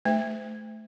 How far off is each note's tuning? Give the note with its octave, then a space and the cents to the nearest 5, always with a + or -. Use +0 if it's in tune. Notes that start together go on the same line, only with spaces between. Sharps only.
A3 -20 C5 -30 E5 +0